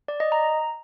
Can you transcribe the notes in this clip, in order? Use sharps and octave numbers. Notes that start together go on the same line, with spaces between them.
D5
D#5
A#5